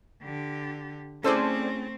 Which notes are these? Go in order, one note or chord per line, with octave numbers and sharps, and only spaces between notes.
D3 G4
A3 C4 C#4 E4 G#4 A4 C5 D5